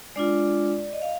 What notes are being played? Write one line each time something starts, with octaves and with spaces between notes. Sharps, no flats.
G#3 D4 F4 D5
D#5
F5